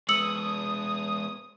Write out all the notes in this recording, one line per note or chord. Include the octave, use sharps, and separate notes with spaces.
G#3 B3 D#6 E6 C#7 F#7